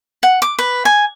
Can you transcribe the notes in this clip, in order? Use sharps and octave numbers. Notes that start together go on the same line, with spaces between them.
F#5
D6
B4
G#5